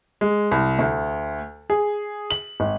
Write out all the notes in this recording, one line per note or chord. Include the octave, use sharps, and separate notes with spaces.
G#3
C2
D2
G#4
F#7
G#1